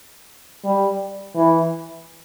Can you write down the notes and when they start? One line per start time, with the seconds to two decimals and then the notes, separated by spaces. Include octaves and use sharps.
0.65 G3
1.35 E3